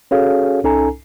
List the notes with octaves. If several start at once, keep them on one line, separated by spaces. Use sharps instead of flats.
C#4 F#4 G#4 A4 C#5 F5
C2 C#4 D#4 A4 G#5 A#5